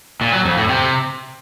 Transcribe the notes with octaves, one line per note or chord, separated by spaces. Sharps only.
A#2
F#3
F2
A2
C3